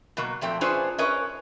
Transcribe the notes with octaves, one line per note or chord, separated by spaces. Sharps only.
B2 F#3 A#3
A#2 F3 A3 C4 G5
C#4 D4 F4 G#4 B4 C5
C#4 A#4 B4 C#5 D#5